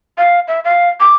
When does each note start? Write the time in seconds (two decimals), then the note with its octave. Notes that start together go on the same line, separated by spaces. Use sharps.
0.18 F5
0.48 E5
0.65 F5
1.00 D6